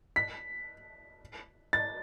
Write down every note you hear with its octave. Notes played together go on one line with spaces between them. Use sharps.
B6
A6